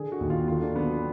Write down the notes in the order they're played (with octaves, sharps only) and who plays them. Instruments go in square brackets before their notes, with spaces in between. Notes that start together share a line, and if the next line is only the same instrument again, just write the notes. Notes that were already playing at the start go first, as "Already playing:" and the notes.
Already playing: [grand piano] D3 G#4
F#4
D#2
F4
D3 F4
D4
F#3 B3